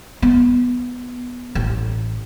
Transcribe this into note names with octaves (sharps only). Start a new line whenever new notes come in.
B3
A1